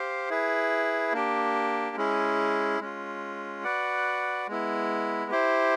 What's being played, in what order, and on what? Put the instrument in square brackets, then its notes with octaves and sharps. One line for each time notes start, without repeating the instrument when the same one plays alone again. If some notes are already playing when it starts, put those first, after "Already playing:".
Already playing: [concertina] G4 C5 F5
E4 G#4 B4
A#3 D4 G4
G#3 C#4 E4 G#4
G#3 C#4 F4
F#4 B4 D5 F#5
G#3 B3 E4
E4 G4 C5